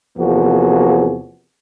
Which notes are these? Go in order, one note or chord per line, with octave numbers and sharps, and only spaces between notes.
E2 C3 F3 A#3 F#4 G#4